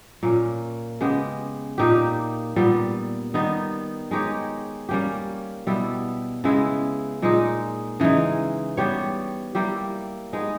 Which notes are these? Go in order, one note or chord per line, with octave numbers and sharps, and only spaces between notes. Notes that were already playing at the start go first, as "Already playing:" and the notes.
A#2 A#3 C#4
C#3 G#3 B3 G4
A#2 A#3 D#4 G4
A#2 G3 B3
D#3 G3 B3 D#4
G#3 D#4 G4 C#5
G3 A#3 C#4 G4
B2 G3 B3 E4
C#3 G#3 B3 E4
A#2 G#3 D#4
C#3 E3 G#3 D#4
G3 B3 G4 C#5
G3 A#3 E4 G4
G#3 B3 D#4